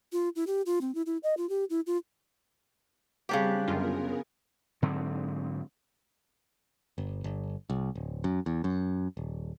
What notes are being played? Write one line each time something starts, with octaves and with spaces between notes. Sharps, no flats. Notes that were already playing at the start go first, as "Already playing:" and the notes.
F4
E4
G4
F4
C4
E4
E4
D#5
F4
G4
E4
F4
C#3 G3 C4 D4 G4 F#6
G1 F#2 B3 F4 G#4 A#4
G#2 D3 F#3 C4
G1
G1
C2
D1
F#2
E2
F#2
D#1